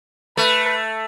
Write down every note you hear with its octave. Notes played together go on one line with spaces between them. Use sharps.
A3 B4